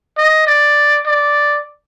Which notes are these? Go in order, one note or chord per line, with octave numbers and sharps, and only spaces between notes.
D#5
D5
D5